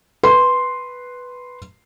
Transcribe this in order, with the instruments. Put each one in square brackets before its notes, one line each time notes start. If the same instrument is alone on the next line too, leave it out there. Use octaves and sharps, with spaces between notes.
[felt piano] B4 C6